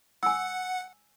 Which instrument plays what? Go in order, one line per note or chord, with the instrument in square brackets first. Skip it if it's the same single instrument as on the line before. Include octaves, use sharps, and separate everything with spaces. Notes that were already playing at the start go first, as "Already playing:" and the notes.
[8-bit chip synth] F#5 [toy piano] G#5 E6